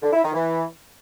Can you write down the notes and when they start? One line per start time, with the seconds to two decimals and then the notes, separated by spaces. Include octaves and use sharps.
0.02 D3
0.13 E4
0.23 D#3
0.34 E3